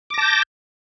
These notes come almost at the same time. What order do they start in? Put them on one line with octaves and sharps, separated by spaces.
D6 A#6 A5 G6